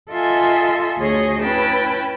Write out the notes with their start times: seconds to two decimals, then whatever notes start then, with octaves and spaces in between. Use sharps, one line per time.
0.12 F4 A4 D#5 E5 G#5 C6
0.99 D2 G#4 C#5 D#5
1.41 C#4 E4 B4 G5 A5